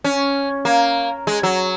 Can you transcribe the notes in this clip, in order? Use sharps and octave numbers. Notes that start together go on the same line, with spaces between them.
C#4
A#3
G#3
F#3